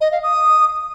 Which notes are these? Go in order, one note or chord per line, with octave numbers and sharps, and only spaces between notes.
D#5
F5
D#6